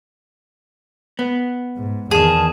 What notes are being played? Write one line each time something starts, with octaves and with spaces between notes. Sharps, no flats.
B3
G#2
E2 D#3 G#4 A5